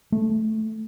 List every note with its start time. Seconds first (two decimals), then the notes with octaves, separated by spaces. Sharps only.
0.12 A3